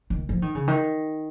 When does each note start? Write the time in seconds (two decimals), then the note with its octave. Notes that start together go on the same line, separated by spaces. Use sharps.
0.10 D#3
0.29 F3
0.42 D#3
0.55 C#3
0.68 D#3